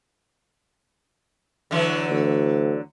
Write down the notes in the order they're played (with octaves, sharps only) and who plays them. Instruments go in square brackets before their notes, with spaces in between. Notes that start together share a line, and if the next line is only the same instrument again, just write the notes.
[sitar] D3 E3 F#3
[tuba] D2